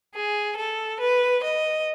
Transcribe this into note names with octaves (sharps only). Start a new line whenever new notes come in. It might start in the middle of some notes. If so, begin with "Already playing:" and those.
G#4
A4
B4
D#5